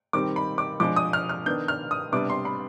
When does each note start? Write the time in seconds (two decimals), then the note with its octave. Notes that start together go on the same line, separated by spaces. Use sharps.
0.13 D#3 G3 C4 D#4 D6
0.36 B5
0.58 D6
0.80 F3 G#3 D4 D6
0.96 D#6
1.13 F6
1.29 F6
1.46 D#3 B3 D4 G6
1.68 F6
1.91 D#6
2.12 C3 G3 B3 D4 D6
2.30 C6
2.45 B5